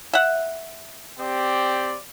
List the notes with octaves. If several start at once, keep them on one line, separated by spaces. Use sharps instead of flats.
E5 F#5
C4 G4 D5